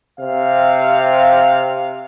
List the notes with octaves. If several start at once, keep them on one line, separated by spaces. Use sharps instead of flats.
C3 F5